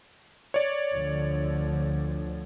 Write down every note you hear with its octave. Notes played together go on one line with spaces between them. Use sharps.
C#5 D5
D2 D3 F3